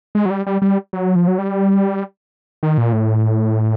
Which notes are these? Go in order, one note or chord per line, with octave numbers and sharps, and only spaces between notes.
G#3
F#3
G3
G3
G3
F#3
F3
F#3
G3
D#3
A#2
A2